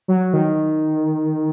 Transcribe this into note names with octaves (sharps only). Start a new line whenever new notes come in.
F#3
D#3